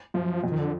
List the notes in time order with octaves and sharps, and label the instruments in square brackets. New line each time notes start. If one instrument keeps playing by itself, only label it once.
[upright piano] F#2 [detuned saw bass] F3
[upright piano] F2
[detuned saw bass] D#3
D3